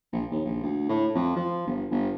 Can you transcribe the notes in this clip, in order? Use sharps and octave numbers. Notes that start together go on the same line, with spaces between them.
A#1
D#2
A#1
D2
A2
F2
F3
G1
G1